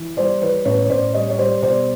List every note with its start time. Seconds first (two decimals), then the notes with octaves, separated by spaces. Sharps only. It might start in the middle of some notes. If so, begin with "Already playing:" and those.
Already playing: E3
0.17 G3 C5 D5
0.41 E3 B4 C#5
0.65 A1 B4 C#5
0.85 C#5
0.89 A1 C5 D5
1.13 G3 C#5 D#5
1.30 C#5
1.38 G3 C5 D5
1.62 B2 C5 D5